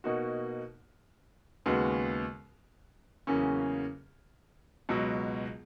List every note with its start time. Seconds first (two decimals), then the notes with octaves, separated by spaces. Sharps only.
0.04 B2 A#3 D#4 F#4
1.66 D#2 C#3 G#3 B3 F#4
3.27 E2 C#3 F#3 A#3 C#4
4.89 C#2 B2 F#3